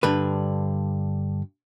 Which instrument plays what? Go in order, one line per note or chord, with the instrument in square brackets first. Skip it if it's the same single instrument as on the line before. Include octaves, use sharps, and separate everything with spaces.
[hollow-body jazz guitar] G2 D3 B4